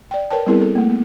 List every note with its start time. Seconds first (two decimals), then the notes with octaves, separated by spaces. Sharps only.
0.11 D5 G5
0.30 A#4 B4 C#5 G5 A5
0.46 G3 B3 C4 E4 G#4 A#4
0.61 A4
0.75 A3 A#3
0.89 B3